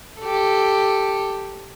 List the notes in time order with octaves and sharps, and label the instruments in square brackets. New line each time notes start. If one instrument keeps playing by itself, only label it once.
[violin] G4 A4